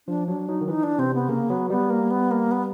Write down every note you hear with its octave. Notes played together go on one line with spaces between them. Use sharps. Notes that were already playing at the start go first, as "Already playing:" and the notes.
F3 D4
F#3 D4
F#3 D#4
D#3
E3 D#4
D4
C3 C4
B3
C#3 A#3
F#3 B3
G3 B3
A#3
B3
A#3
B3